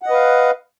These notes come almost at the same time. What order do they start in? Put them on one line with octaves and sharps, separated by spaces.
F#5 D#5 B4 F5